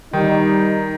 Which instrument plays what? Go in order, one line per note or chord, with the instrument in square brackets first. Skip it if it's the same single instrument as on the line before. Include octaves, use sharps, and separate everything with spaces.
[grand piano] D#3 [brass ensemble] G3 D#4